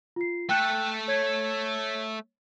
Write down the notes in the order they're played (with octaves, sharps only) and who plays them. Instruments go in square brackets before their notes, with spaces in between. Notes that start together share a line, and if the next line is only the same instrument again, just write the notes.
[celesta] F4 C7
[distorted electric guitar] A3 A4 [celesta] G5 F#6 G6
[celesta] C#5 G#6